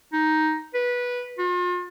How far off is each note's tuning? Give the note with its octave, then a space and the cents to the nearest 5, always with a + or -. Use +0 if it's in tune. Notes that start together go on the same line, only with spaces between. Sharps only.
D#4 +5
B4 -15
F4 +40